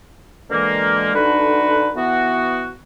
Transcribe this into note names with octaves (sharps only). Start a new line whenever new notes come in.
B2 D3 E3 G#3 A#3
D3 A3 D4 D#4 F#4 B4
E3 B3 F#4